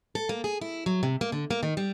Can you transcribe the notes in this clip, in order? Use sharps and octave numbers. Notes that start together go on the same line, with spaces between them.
A4
A#3
G#4
E4
F#3
C3
A#3
D3
A#3
D#3
G3